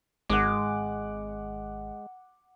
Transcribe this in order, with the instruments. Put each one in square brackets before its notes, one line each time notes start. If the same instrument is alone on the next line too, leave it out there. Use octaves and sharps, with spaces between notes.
[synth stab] G#1 [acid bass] G#3 [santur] F#5 D6